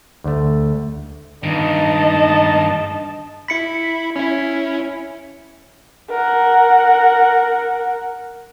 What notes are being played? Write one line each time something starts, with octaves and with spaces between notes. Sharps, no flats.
D2 A3
G2 D#3 D#5 A5
E4 B5 B6 C#7
C#4 E4
A#4 F#5